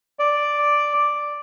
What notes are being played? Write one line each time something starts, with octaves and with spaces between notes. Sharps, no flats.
D5